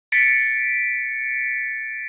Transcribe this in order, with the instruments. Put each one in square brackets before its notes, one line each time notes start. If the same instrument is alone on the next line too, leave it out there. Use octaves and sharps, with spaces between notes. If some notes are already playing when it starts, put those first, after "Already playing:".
[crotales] A6 B6 C#7 D7